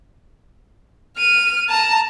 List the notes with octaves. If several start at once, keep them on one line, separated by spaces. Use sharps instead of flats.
F6 D#7
A5 A#5